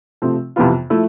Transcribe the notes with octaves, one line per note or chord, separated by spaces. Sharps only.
C3 F3 A3 C4
F2 C3 E3 B3 F4
F3 A3 E4